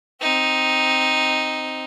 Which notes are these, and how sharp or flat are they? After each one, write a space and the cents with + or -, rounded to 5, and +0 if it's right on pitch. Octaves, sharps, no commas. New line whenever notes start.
C4 +0 D#4 +0